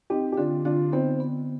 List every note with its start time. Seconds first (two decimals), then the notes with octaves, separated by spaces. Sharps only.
0.10 C4 D#4 G4
0.32 G4
0.37 D3 D4 F4
0.65 D3 D4 F4
0.92 B3 C4 D#4
1.20 B3